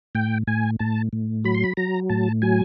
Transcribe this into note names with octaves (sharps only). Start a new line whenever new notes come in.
A2 G5
A2 G#5
A2 A5
A2
F#3 B5
C6
B5
F#3 A#5
A2 A5
F#3 G#5